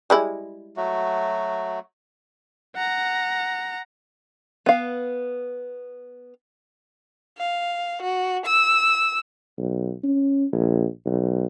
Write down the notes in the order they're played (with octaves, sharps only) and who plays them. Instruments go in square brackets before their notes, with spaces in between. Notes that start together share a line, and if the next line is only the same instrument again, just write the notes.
[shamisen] G3 G#3 E4
[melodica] F#3 A3 F#4
[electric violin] F#5 A#5
[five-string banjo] B3 F5
[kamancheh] F5
F#4
E6
[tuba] B1
C#4
A#1
B1